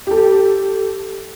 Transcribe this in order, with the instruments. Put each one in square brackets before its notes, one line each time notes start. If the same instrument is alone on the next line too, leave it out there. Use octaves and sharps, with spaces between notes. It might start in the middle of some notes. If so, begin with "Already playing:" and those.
[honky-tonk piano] G4 A4